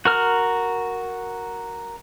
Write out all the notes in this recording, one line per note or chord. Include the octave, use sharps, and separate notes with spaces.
F#4 A#4 F6